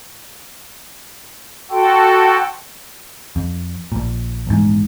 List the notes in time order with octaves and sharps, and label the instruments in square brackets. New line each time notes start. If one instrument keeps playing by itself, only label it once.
[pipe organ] F#4 A4 [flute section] G5 C6
[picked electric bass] F2
A#1 A#2
A#1 E2 G#2